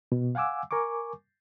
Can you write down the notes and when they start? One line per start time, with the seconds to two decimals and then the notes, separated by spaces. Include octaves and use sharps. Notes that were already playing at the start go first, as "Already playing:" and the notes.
0.12 B2
0.35 F5 F#5 G#5 D6 E6
0.71 A#4 G#5 C#6 D6